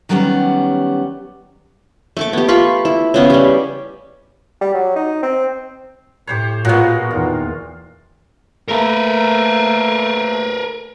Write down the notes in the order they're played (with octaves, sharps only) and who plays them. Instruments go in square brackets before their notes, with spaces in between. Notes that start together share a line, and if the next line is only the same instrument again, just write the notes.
[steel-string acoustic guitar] D#3 F#3 G3 B3 C#4 G4
[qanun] A3 C#6 D6
B3 G4
F4 B5 C#6
E4
C#3 B3 C#4
G3 G4
[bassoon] G3
F#3
D#4
C4
[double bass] A2 [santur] G4 C5 C#5
[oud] A#2 B3 [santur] F#3 G#3 F#4 [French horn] F4
[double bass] E2 [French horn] D#3 [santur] F4
[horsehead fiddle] A3 A#3 [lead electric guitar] A#4 B4